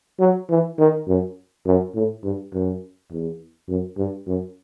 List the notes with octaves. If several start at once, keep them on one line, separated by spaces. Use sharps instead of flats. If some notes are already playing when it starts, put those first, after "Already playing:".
F#3
E3
D#3
F#2
F#2
A2
G2
F#2
E2
F#2
G2
F#2